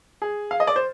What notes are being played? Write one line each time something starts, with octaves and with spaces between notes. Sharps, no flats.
G#4
F5
D#5
D5
C5